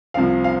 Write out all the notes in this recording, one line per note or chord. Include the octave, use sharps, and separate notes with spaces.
C2 C3 F3 F5
F5